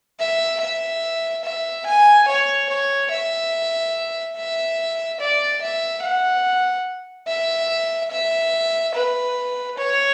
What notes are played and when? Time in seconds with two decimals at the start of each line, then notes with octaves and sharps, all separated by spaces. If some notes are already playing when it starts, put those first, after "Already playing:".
0.19 E5
0.60 E5
1.44 E5
1.86 G#5
2.28 C#5
2.69 C#5
3.11 E5
4.36 E5
5.20 D5
5.62 E5
6.02 F#5
7.28 E5
8.11 E5
8.94 B4
9.78 C#5